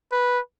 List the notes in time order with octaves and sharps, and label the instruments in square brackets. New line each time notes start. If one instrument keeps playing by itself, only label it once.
[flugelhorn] B4